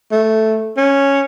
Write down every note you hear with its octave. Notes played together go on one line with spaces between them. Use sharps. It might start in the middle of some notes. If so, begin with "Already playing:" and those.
A3
C#4